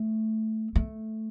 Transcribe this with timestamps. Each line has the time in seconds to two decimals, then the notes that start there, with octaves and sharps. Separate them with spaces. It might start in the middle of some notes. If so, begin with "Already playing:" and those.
Already playing: A3
0.75 A3